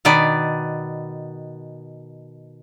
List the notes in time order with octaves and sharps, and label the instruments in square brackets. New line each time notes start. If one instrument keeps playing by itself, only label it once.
[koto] B2 D#3 B3 D5